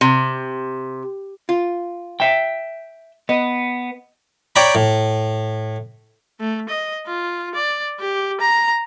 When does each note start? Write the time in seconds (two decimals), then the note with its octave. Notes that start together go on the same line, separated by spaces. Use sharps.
0.01 C3
1.49 F4
2.20 E5 G5
3.29 B3 D#5
4.56 C#5 D5 G5 A#5 B5
4.75 A2
6.40 A3
6.69 D#5
7.06 F4
7.55 D5
7.99 G4
8.40 A#5